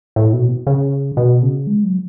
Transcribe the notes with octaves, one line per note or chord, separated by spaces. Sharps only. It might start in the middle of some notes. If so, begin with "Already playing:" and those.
A2
B2
C#3
B2
C#3
G#3
F#3